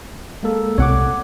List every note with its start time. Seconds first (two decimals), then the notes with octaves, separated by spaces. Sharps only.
0.43 G#3 A#3 A4
0.78 C2 C#5 F#5 D6